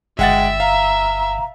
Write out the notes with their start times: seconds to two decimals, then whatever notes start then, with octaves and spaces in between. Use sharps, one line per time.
0.19 G1 G#3 E5 F#5 G5 A6
0.60 F5 A#5